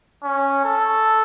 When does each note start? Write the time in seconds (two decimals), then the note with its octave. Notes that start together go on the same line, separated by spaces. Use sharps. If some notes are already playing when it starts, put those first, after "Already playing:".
0.24 C#4
0.65 A4